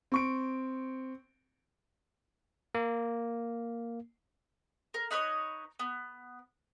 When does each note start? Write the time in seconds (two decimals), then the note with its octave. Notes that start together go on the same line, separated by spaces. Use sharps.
0.12 C4 C#6 D7
2.75 A#3
4.94 A#4
5.11 D#4 B4 C#5 D#5
5.79 B3